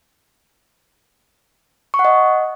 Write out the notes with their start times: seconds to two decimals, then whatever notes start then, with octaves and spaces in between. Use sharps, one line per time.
1.94 C#6
1.99 F#5
2.05 D#5